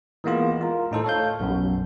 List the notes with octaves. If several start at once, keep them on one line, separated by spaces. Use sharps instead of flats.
E3 G#3 A#3 B3 F4
F4 A#4
A2 D#4 A4 C5
A4 C#5 F5 G6
B1 F#2 B2